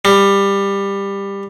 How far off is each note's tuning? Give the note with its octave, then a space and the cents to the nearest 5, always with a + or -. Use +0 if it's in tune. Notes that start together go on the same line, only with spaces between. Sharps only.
G3 +15